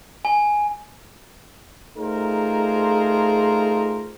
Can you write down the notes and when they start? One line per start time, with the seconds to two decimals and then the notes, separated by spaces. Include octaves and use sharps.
0.25 G#5
1.98 A3 D#4 F4 G#4 A#4 C5